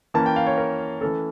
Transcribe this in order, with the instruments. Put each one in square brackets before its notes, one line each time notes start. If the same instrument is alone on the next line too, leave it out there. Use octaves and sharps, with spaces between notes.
[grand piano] E3 A#3 C#4 A5
G5
F5
C#5
A#4
E3 A3 C#4 A4